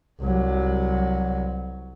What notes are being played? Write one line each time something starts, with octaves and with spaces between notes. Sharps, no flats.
C2 F#3